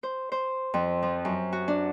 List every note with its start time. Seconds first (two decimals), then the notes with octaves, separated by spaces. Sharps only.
0.03 C5
0.32 C5
0.74 F2
1.03 F3
1.25 F#2
1.53 F#4
1.68 D4